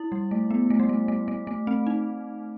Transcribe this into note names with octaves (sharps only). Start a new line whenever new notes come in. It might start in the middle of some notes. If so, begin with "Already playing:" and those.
Already playing: E4
G3
A3
B3
A3
G3
A3
A3
A3
A3
C4
D#4